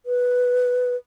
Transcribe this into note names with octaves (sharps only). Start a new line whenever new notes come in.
B4